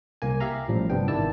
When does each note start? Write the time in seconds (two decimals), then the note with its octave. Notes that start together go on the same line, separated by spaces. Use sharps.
0.22 C2 A#3 G#5
0.40 G4 E5 F5 A#5
0.68 A1 A2 F3 G3
0.90 G1 G2 C3 B3 D4 G5
1.08 G#1 D#3 E4 D5 A5 E6